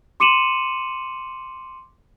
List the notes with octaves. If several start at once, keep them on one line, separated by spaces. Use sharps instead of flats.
C6 D6 C#7 D#7 E7 F#7